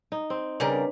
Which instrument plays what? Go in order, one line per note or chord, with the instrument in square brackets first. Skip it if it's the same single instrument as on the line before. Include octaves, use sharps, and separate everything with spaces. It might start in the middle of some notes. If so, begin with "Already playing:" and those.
[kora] D#4
C4
[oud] C#3 G3 A#4 [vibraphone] D4 B4 C#5